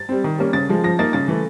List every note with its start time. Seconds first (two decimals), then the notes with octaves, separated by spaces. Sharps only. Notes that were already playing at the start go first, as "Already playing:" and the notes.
Already playing: A6
0.09 G3 C4
0.24 D#3
0.38 G3 A#3 C#4
0.53 C#3 A6
0.69 F3 G#3
0.84 F3 A#6
0.99 A#3 D#4 A6
1.13 C#3 A6
1.28 E3 A3